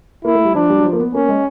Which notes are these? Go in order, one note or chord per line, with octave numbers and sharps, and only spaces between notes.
A#3 E4
A3
G3
F3 D4
G3
F#3
F3
A#3
B3
A#3 C#4
G#3